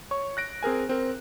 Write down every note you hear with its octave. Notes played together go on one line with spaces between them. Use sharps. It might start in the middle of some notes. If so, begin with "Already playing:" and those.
C#5 C#6
F#6 A#6 D7
C4 G#4 A#4 G#5
C4 A#4